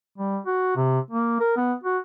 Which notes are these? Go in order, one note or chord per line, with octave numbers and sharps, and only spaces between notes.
G3
F#4
C3
A#3
A#4
B3
F#4